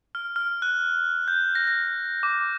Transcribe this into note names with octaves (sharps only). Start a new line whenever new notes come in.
F6
F6
F#6
G6
A#6
A#6
D6